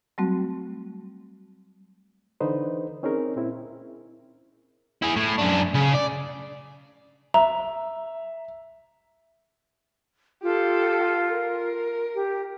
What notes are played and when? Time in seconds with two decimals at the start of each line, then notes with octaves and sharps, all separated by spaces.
0.18 F#3 G3 A3 C4 F#4
2.40 D3 E3 D#4 B4 C5
3.03 C4 C#4 D#4 G#4 A#4
3.36 A#2 C4 E4
5.02 E4 G#4
5.16 A2
5.38 F#2 D4
5.74 C#3
5.94 D5
7.34 E5 A#5
10.43 F4 G4 A4
11.28 A#4
12.15 G4